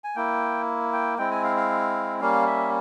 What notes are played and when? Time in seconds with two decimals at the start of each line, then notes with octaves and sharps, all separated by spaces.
0.04 G#5
0.16 A#3 E4 G5
0.93 G5
1.18 G#3 C4 E4 G5
1.31 G#5
1.44 F5
1.56 F5
2.21 G3 A#3 C#4 F5
2.47 E5